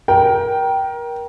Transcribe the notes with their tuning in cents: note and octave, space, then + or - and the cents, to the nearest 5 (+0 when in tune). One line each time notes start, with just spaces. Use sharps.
A#4 +25 G5 -15